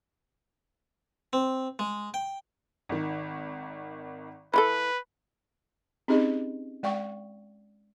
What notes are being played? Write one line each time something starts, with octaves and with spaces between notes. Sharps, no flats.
C4
G#3
G5
G#1 D#3
E3 F4 A4 B4 B5
C4 C#4 D#4 G4 G#4 D#5
G#3 D5 F5 G5 C#6